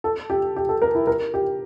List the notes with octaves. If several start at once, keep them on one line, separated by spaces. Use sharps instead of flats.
A4
G4
G4
A4
A#4
E4
A#4
G4